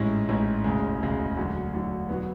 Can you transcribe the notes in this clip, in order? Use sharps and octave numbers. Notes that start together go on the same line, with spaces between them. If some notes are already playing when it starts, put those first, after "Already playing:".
Already playing: A1 G#2 G#3 C#4 E4
A1 G#2 G#3 C#4 E4
E1 D2 C#3 G#3
E1 D2 C#3 G#3
D2 D3 F#3
D2 D3 F#3
B2 F#3 B3